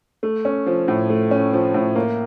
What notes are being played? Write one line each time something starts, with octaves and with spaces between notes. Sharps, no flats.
A3
C#4
F3
A2
A3
C#4
F3
A2
A#3